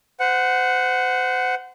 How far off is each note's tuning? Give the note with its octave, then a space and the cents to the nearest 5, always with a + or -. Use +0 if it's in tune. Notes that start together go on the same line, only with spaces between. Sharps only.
C5 -30 F#5 +0